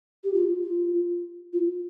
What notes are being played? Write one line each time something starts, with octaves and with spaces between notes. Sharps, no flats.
G4
F4
F4
F4